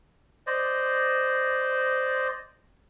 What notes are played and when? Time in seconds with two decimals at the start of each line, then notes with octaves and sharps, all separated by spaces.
0.47 C5 D5 D#5